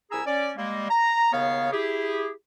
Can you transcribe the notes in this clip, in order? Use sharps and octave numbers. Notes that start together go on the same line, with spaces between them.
C2 E4 G#4 G#5 A#5 E6
C#4 D5
G3 G#3 A#3
A#5
D#2 C#3 B3 C#5 F5
E4 G4 G#4